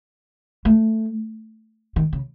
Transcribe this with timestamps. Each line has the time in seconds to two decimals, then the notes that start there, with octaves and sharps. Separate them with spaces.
0.65 A3
1.96 D#3
2.13 C#3